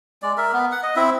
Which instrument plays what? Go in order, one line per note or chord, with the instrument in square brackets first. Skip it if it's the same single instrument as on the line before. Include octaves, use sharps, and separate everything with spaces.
[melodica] G#3 D5
A#4 E5
B3
F#5
D#5
C4 E4 E5